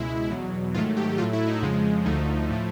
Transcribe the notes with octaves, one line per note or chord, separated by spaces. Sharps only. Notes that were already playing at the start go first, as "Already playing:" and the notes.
Already playing: C#2 B2 G#3 E4
E2 B2 F#3
G#2 D#3 F#3 A3 F4
G4
A2 F#3 A3 F4
E4
D#4
F2 C#3 F3 G#3
D2 D3 F3 A3 D#4
A2 F3 A3